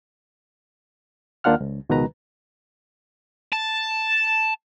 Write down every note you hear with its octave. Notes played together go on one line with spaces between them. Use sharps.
D#2 A#3 D4 F4 F#5 F6
C#2
C#2 B2 D#3 B4 A#5
A5